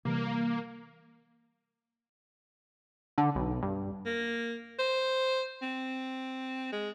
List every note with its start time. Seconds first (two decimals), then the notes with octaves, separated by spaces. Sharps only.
0.05 C3 E3 G3 A#3
3.18 D3
3.35 B1
3.63 G2
4.06 A#3
4.79 C5
5.62 C4
6.72 G#3